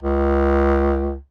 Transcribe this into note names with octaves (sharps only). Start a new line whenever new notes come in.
C#2